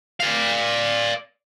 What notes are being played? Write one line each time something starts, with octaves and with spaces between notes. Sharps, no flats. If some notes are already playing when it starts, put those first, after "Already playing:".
D5 F5